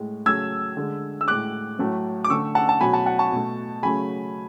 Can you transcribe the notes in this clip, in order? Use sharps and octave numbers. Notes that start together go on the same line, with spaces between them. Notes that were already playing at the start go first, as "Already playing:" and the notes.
Already playing: A2 G#3
C#3 F#3 A3 E6 G#6
D3 G#3
E6
A2 G#3 D6 F#6
A2 F#3 A3
D6
D3 A3 C#6 E6
F#5 A5
A5
B2 F#3 A3 G#5 B5
F#5 A5
F#5 A5
A5 C#6
B2 A3
C#3 F#3 A3 G#5 B5